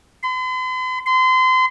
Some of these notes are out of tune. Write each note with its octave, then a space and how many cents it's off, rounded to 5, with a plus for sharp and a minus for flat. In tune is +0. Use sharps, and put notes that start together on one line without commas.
C6 -45
C6 -30